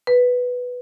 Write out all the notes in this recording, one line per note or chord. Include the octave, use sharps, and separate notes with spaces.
B4